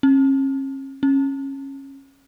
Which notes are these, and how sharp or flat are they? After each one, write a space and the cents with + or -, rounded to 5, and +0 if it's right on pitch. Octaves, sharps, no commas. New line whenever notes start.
C#4 -40
C#4 -20